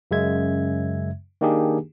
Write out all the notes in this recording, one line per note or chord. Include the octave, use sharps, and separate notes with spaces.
F#2 C#3 G#3 E5 G#6
D#3 A#3 D4 D#4 G4 G#4